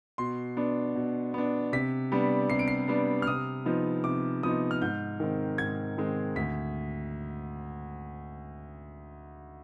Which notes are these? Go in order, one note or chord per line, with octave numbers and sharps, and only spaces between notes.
B2 C6
B3 D4
B2
B3 D4
C3 B6
G3 B3 D4
C3 C7
D7
C7
G3 B3 D4
F6
C3 D#6
F3 B3 D#4
C3 D6
F3 B3 D#4 D#6
F6
G#2 G6
D#3 G#3 C4
G#2 G#6
D#3 G#3 C4
D2 B6